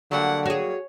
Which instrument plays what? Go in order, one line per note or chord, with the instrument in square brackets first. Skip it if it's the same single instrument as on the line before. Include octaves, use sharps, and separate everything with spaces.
[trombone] D3 [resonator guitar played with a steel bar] F#3 G3 A#3 [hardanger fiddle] F#5
[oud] F#4 G#4 [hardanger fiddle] C#5